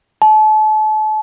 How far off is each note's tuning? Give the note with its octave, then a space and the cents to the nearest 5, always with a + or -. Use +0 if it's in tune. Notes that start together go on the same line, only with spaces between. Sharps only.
A5 -35